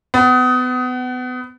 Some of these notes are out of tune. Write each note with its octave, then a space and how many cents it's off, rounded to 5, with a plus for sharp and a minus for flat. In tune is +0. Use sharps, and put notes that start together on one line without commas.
B3 +30